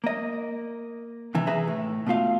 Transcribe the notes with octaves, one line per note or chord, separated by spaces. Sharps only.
A#3 D#5
C3 E3
G#4 B4 E5 G#5 A#5
A2
B2 A3 F4 F5